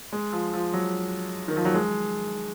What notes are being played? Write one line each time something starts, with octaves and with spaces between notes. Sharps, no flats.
G#3
F3
F3
F#3
D#3
F3
F#3
G#3